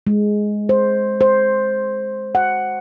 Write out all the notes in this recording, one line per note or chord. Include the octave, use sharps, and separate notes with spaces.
G#3
C5
C5
F#5